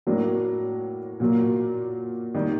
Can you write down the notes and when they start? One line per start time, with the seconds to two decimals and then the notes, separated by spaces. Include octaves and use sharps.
0.07 A2 F#3 A#3 D4
1.20 A#2 F#3 A#3
2.34 D#3 G3 A#3